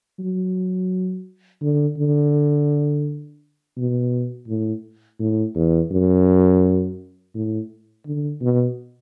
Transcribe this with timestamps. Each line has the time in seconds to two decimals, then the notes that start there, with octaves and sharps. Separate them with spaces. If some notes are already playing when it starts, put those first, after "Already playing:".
0.19 F#3
1.62 D3
1.98 D3
3.77 B2
4.48 A2
5.20 A2
5.55 E2
5.91 F#2
7.34 A2
8.07 D3
8.41 B2